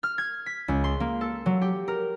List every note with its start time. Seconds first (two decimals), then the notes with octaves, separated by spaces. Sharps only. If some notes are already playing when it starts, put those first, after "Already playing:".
0.03 F6
0.18 G#6
0.46 B6
0.68 C#2
0.84 C6
1.00 A#3
1.21 A4
1.46 F#3
1.62 G4
1.88 A#4